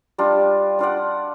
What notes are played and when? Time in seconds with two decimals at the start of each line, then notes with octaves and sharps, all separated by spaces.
0.18 G3 D4 F4
0.79 D4 F4 D5 F#5